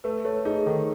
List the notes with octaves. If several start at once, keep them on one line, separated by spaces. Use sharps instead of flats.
A3 B4
A3 C#5
D#4 G#4
D#3 A4